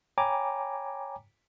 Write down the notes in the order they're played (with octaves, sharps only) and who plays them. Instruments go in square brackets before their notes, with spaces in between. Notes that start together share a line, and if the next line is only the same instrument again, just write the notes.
[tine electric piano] C#5 G5 G#5 A#5 B5 D6